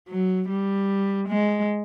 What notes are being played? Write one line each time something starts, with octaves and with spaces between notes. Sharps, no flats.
F#3
G3
G#3